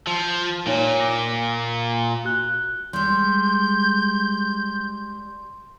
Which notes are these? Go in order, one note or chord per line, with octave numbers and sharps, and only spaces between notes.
F3
A#2 D#4 C#5
D6 A#6
F#4 F#6 G7
G3 G#3 C6 G6